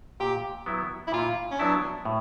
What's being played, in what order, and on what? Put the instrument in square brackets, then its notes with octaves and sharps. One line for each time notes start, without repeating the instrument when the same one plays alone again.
[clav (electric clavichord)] A#2 [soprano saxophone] G4
[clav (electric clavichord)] F#3 B3 E4
[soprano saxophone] E4
[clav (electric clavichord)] A#2 [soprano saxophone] F4
[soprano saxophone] C#4
[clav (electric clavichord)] F#3 B3 E4 [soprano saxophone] D4
[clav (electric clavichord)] A2